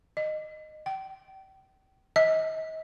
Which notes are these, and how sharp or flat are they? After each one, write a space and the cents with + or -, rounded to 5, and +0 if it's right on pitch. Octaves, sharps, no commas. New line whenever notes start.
D#5 -15
G5 -35
D#5 +35